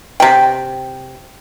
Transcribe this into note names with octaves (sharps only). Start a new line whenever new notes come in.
C3 G5